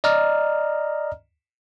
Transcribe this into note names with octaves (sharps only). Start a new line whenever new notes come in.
D5 D#5 A#5 F6